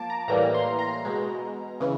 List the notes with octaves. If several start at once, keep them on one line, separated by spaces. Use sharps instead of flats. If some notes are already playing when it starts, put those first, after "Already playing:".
Already playing: F3 A#3 A5 D6
A#5
A2 E3 G3 A#3 A#5
C6
A#5
B2 G#3
C#3 E3